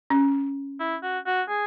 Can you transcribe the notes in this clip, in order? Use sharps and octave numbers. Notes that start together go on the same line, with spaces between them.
C#4
E4
F#4
F#4
G#4